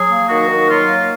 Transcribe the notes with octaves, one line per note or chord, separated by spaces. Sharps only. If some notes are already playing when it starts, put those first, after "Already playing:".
Already playing: F#3 G#4
A#3
D#3 F#4
D#3
F#3 F4
A#3